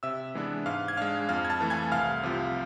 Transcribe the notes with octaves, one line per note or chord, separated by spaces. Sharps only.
C3 E5 E6
E3 G#3 B3 D4
G#2 F5 F6
G#6
G#3 D4 F5 F6
F2 F5 F6
G#6
A5 A6
E3 A3
G#5 G#6
C2 F5 F6
C3 F3